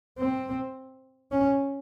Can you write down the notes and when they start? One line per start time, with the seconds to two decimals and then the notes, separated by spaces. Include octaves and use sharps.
0.19 C4
1.32 C#4